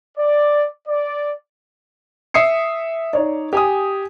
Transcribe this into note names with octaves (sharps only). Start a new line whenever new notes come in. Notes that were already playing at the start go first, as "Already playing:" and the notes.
D5
D5
E5 D#6 C7 C#7
D#4 C#5 D5
G4 G#5 D#6